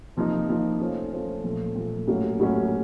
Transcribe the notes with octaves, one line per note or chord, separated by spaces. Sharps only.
C3 F3 A#3 D#4
C3 F3 A#3 D#4
A3 C#4 F4 C5
A3 C#4 F4 C5
A#2 F3 A3
A#2 F3 A3
A2 F#3 A#3 C#4
A2 F#3 A#3 C#4